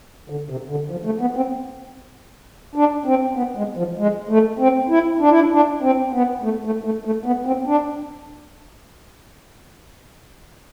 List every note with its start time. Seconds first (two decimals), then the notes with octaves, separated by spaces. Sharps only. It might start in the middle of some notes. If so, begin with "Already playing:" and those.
0.30 D3
0.50 C3
0.70 D3
0.91 F3
1.05 A3
1.21 B3
1.36 C4
2.75 D4
3.06 C4
3.36 B3
3.57 G#3
3.77 F3
3.98 G#3
4.29 A3
4.59 C4
4.90 E4
5.20 D4
5.30 E4
5.40 D4
5.52 D4
5.82 C4
6.13 B3
6.43 A3
6.65 A3
6.84 A3
7.05 A3
7.26 B3
7.46 C4
7.67 D4